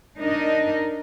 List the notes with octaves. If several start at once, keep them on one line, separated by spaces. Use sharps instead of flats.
D4 D#4 A#4 D#5